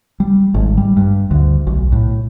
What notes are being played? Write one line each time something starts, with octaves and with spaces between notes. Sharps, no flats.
G3
G#1
G3
G2
D2
B1
A2